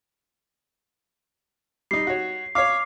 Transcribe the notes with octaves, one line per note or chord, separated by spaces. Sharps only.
G3 D#4 C7
F#4 C#5
C#5 F5 D6 F6 C7